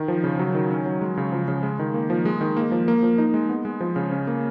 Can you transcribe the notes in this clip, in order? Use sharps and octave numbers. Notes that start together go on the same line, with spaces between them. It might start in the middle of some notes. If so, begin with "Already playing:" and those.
Already playing: D#3
F3
C#3
F#3
D#3
C#4
F#3
G#3
C#3
F3
C#3
G#3
D#3
A#3
F3
G#3
D#3
A#3
F3
A#3
F3
D#4
G#3
B3
G#3
F3
C#3
C#4
A#3